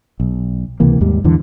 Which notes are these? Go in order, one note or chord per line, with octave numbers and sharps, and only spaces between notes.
B1
C#2 C3 E3 A#3
D#2 G#2 G3
E2 G#2 D3 E3